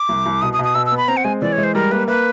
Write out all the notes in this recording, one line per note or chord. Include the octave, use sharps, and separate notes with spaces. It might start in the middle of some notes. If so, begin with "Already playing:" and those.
Already playing: D6
C2
C2
B2 D#6
D#6
B2
D#6
B2 E6
E6
B3
B5
C4 A#5
F#5
G#3 G#5
E3 D5
C#5
G#3
C5
G3 A#4
A#3 B4
A#3 B4